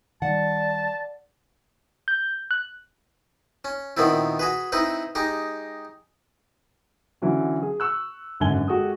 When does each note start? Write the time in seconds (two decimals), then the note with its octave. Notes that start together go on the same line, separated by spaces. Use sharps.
0.22 D#3 G3 D5 F#5 A5
2.08 G6
2.51 F#6
3.65 C#4
3.97 A#2 D#3 B3 C4 E4
4.39 F#4 G#4 B4
4.72 C4 D#4 E4 B4
5.15 G#3 D#4 G4
7.22 D3 E3 F#3 C#4
7.63 G#4
7.80 C#6 E6 F#6
8.40 G#1 F#2 D3 G#5 G#6 G7
8.67 G#3 F#4 G4 A4 D#6